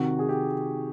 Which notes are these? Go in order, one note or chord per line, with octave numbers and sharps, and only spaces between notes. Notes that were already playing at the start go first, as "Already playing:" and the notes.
Already playing: C3 D#3 F#4
G#4
G4